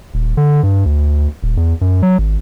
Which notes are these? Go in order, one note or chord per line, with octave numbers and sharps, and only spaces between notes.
D#1
D3
G2
D2
D#1
E2
F#2
F#3
G#1